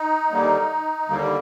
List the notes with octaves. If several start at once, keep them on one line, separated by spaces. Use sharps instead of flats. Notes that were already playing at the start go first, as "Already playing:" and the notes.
Already playing: D#4
D#2 D3 G3 A#3
D#2 D3 G3 A#3